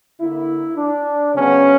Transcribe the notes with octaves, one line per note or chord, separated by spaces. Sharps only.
D3 A#3 E4
D4
C#3 F#3 B3 C#4